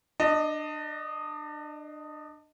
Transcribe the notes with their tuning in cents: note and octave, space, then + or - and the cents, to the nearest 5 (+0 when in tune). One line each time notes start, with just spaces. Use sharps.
D4 +30 D#5 +0